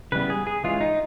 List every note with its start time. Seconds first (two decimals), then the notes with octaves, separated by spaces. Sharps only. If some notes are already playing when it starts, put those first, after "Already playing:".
0.12 C#3 E3 G3 B3 B4
0.30 G#4
0.47 G#4
0.64 E3 G#3 C#4 F4
0.81 D#4